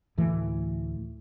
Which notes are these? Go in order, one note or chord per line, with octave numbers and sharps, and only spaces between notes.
D2 A2 E3 A3